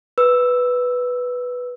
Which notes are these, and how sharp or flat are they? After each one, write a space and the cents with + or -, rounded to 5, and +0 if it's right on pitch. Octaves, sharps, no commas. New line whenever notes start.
B4 +0 E6 +0